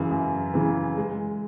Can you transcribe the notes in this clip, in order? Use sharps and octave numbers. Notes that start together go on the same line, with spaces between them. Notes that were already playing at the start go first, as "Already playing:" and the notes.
Already playing: F#2 C#3 E3
F#2
C#3 E3
G#3